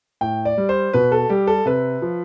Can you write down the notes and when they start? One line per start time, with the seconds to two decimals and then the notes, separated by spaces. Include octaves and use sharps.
0.21 A2 G5
0.45 D5
0.58 G3
0.69 C5
0.93 B2 B4
1.12 A4
1.29 G3 G4
1.47 A4
1.66 C3 B4
2.02 F3